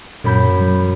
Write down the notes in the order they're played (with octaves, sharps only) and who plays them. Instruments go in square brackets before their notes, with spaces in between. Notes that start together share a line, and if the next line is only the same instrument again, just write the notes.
[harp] F#2 B5 G6 [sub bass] A#2
[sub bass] F#3